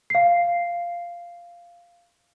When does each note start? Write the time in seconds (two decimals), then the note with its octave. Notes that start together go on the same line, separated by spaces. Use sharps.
0.10 F5 C7